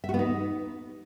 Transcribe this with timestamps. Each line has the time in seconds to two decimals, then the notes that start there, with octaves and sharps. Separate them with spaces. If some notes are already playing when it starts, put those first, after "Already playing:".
0.04 E5
0.09 F#4
0.14 B3
0.19 D#4